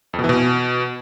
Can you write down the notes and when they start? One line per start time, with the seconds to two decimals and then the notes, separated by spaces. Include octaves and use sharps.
0.13 F2
0.19 B2
0.24 E3
0.29 B2